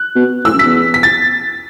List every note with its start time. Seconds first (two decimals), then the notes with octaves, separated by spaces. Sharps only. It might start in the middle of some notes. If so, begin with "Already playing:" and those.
Already playing: F#6
0.15 B2
0.45 A2 E6
0.54 F#2
0.59 E2 B6
0.94 B6
1.03 A6